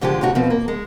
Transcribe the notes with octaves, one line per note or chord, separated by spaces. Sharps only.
G#2 D3 F3 G#3 G4
A2 C#3 D#4 F#4
B2 F3 C4
A#3
G#3